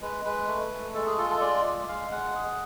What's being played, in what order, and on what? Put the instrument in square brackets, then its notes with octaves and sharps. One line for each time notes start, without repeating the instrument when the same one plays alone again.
[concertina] G#3 B4
G#3 B4
A3
A3
G#3 A4
G#4
F4 A4
A4
G#3 D5
G#3
G#3 F5
G#3 F#5
G#4